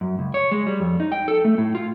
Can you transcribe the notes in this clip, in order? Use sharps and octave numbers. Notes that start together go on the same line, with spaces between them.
F#2
C#2
C#5
G#3
G3
F2
D#4
G5
A4
A3
A2
F4